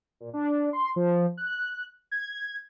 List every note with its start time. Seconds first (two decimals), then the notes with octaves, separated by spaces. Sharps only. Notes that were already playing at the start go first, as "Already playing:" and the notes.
0.20 A#2
0.33 D4
0.73 C6
0.96 F3
1.37 F#6
2.11 G#6